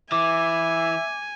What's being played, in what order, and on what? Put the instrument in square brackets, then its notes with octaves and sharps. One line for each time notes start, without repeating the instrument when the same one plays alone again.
[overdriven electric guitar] E3 [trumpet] E5 [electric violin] G#5 [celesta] D6